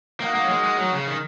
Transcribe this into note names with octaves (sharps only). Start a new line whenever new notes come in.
A#3 D#4 F#4 A#4 D#5 F#5
A#3
F#3
G#3
G#3
F#3
C#3
D#3